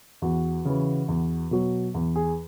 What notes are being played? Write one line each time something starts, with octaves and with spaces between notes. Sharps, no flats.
E2 F#4
C#3 E3
E2
B2 F#3
E2
G#4